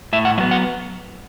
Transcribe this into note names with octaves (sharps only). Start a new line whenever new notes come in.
A2 E5
F#5
F#3 B3 E5
F#5